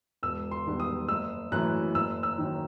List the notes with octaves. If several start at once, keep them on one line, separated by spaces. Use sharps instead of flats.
E1 E6
C6
E2 D#3 G3 B3
D#6
F#1 E6
F#2 E3 A3 E4 F#6
F#1 E6
E6
F#2 D#3